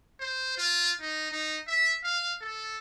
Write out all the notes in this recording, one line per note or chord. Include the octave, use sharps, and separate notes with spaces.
C5
F4
D#4
D#4
E5
F5
A4